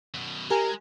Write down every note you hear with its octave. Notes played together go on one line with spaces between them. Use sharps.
F#2 B2
G#3 G4 A#4 G#5